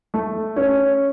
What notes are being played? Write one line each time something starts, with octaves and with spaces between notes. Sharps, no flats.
A3
C#4